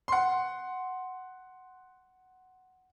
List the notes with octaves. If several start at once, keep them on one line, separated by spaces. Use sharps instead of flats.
F#5 C6